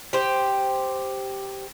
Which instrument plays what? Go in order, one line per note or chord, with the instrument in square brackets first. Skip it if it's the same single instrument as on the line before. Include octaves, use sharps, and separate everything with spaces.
[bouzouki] G4 C5